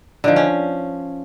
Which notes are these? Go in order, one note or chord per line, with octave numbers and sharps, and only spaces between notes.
D3 D#3 F3
C#4